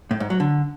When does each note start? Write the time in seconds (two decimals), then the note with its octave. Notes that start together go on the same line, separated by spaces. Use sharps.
0.11 A2
0.20 G#2
0.30 F#3
0.40 D3